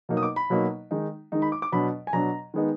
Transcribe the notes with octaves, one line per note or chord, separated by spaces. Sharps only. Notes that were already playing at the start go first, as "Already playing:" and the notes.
B2 F#3 A#3 D#4
D#6
D6
B5
B2 F#3 A#3 D#4
D#3 G#3 D#4
D#3 G#3 D#4
B5
D6
D6
B2 F#3 D4 B5
G#5
B2 F#3 D4 A#5
D#3 G#3 B3 D#4